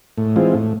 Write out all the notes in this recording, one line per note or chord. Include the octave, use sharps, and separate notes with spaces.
A2
E3 G#3 C4 F4
A2